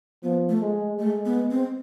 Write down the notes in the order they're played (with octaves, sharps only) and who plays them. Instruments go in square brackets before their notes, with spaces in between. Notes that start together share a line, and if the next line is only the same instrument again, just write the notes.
[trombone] F3 [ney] B3
[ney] A3
[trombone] G#3
[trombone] G#3 [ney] A3
[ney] B3
C4